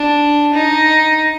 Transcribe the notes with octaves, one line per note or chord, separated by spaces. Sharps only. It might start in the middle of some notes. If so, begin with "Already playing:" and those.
Already playing: D4
D#4